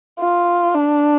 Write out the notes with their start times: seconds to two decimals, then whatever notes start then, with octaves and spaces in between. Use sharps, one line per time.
0.19 F4
0.74 D4